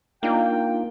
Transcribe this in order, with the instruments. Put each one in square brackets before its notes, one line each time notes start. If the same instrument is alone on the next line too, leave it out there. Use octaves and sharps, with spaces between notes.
[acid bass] A#3 [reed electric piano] D4 D#4 F4 [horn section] G5